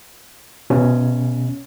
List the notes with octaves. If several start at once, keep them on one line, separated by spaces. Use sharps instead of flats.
B2 C#4